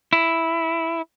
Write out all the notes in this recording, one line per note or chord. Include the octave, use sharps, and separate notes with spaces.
E4